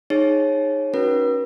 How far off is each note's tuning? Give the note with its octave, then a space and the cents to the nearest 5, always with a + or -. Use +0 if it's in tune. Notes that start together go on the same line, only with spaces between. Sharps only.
D#4 -10 G#4 +0 C#5 -20
C#4 +5 F#4 +0 B4 -45